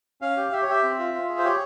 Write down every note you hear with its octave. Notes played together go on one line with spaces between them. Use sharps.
C#4 F5
G4
G4 E5
C#5
G4 E5
C4
F4
F4
G#4
C5
G4 C#5